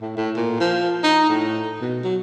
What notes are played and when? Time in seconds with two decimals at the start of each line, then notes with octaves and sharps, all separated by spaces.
0.01 A2
0.17 A2
0.36 A#2
0.60 F3
1.04 D#4
1.29 A2
1.81 B2
2.04 F#3